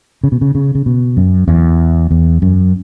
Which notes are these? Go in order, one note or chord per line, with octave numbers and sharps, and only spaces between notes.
C#3
B2
C#3
C#3
C#3
B2
F#2
E2
E2
F#2